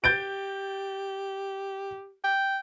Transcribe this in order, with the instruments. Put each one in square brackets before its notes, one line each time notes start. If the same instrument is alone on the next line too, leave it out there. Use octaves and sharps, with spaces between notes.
[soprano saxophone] G4 [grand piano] G6 A6 D7
[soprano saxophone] G5